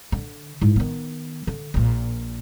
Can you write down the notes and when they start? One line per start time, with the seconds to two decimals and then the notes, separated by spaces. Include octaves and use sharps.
0.12 D3
0.61 G#2 E4
0.76 D#3 B3
1.47 D3
1.74 A#1 A#2